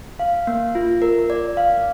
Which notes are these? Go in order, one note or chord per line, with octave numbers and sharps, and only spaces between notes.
F5
A#3
F4
A#4
D5
F5